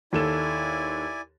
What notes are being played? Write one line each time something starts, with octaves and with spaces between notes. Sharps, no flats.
D#2 E4 A4 D5 G#5 E7